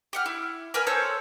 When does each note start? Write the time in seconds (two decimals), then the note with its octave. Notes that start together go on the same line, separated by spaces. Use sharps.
0.13 G4 F#5 F6
0.26 E4
0.74 A#4 B4 G#5 F6
0.86 A4 C5 C#5 E6